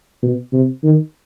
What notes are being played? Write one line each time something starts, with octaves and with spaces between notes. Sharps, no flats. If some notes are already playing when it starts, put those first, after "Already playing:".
B2
C3
D#3